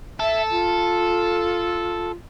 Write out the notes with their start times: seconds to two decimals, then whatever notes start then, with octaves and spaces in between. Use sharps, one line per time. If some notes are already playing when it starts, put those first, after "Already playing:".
0.20 A4 E5
0.51 F4